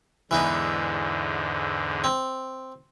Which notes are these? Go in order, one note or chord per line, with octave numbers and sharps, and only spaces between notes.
E2 G#2 D3 E3 B3 D#4
C4